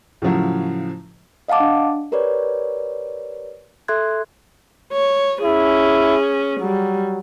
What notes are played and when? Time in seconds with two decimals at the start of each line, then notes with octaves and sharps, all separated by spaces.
0.22 A2 C#3 F3 F#3
1.48 D#5 F5 F#5 A5 D6
1.60 D4
2.12 G4 A#4 B4 C#5 D5
3.88 A4 E5 C6 F#6 G#6
4.92 C#5
5.43 C#4 E4 G#4
6.60 F#3 G3